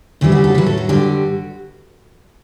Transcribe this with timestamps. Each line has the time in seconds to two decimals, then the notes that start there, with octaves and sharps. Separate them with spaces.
0.21 D2 C#3 E3 G3 E4
0.32 F#4
0.44 A4
0.54 A2 F#3 B4
0.66 A4
0.78 F#4
0.89 G2 D3 G3